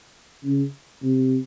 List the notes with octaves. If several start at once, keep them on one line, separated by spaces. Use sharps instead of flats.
C#3
C3